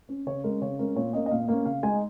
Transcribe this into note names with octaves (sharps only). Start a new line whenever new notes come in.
C#4
C#3 C#5
G#3 C#4 A#4
C#3 C#5
G#3 C#4 A#4
A#2 C#5
A#3 C#4 D#5
D#5
A#2 F5
A#3 C#4 F5
C#3 F5
G#3 D#4 G#5